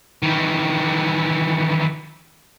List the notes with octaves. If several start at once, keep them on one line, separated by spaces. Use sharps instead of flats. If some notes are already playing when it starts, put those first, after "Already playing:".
D#3 E3